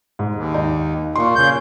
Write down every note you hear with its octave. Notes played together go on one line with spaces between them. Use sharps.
G#2
D#2
D#4
A#2 C6 C#6
C#3 G6